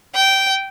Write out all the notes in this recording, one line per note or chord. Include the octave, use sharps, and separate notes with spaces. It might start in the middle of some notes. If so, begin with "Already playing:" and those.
G5